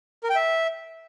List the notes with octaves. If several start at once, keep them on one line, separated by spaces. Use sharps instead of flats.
A#4
G5
E5